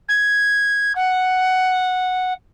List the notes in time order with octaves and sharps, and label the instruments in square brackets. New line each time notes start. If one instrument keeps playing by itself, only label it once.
[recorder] G#6
F#5